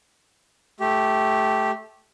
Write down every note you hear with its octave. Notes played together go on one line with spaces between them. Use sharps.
A3 G4